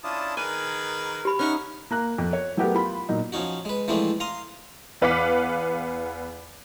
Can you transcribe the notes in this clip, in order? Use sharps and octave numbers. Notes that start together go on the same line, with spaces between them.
C#4 D4 E4 F4 A5 D#6
D#3 G#4 A#4 B4 G#5
G4 B5
C#4 D#4 E5 F#5 C#6 F6
A#3 A#5 F#6
F2
C#5
F#3 A3 B3 G4 A#4 F#5
F4 B5
A#2 F#3 D#4
F3 C#4 D#4 F#4
G#3 B4
E3 F3 G#3 A3 C4 D4
F5 A#5 C6 D#6
E2 B4 F5 F#5 D6 B6